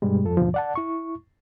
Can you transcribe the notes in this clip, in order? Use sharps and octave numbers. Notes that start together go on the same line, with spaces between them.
G2 B2 G3 G#3
F2 F3 A4
D#2 G#2 B2 D3 F3
D5 F#5 A5
E4 C#6